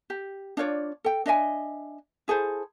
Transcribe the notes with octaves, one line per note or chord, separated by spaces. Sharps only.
G4
D4 F4 C#5 D5
A4 G5
D4 D#5 E5 G#5
E4 G#4 A4 C5